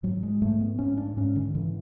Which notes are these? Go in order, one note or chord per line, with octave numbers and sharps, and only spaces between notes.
G#2 F#3
G#3
G#2 A3
B3
G#2 C#4
D4
G#2 C#4
D3
D3 E3